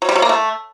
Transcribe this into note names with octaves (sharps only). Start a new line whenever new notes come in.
F#3
G3
F#3
A#3
A3